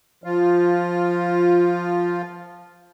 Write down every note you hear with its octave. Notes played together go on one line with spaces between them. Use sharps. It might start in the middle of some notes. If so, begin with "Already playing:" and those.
F3 F4